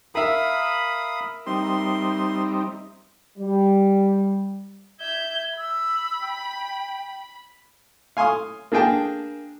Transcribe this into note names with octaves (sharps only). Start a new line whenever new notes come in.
A#4 E5 F5 B5 D#6
G3 C4 D#4 C6
G3
E5 G6 G#6
B5 E6
G5
F5 G#5 C6 C#6 D#6
A#3 D4 G#4 G5 A5